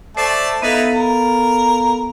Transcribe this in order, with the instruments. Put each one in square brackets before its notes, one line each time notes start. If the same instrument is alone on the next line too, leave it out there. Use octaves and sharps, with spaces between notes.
[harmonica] A3 D5 A5 [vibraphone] C5
[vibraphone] B3 A4 F5 [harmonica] D#4 E4 B4
[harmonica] A#4